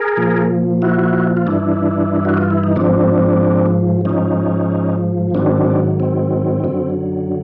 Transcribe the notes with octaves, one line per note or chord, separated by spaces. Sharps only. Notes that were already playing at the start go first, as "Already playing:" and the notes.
Already playing: G#4 A#4
A#2 F3
E4 F#4
F4
G2 E3 D4 E4
F#4
F4
E4
D#4
G#2 F3 C4 D4
G#2 F3 C#4 D#4
G#2 D#3 F#3 C4 D4
C4
F#2 D3 F#3